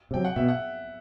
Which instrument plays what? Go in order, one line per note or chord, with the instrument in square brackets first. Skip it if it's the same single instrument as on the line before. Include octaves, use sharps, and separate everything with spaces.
[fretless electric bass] C3 F#3 [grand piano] G5
[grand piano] F#5
[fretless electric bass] B2 [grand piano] E5
[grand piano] F#5